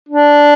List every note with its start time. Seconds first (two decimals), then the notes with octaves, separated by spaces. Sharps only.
0.09 D4